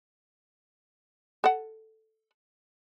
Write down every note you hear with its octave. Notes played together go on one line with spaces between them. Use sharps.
A4 F#5